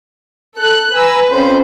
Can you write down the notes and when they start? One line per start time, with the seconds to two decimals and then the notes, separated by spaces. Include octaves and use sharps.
0.58 A4 F#6
0.95 B4 G#5 A#5 E6
1.32 F2 C#4 C5